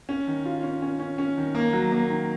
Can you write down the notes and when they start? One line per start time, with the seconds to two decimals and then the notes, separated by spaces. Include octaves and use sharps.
0.09 C#4
0.27 D#3
0.46 F4
0.63 C#4
0.82 C#4
0.99 C#4
1.18 C#4
1.37 D#3
1.55 A#3
1.73 F#3
1.92 A#3
2.10 D#3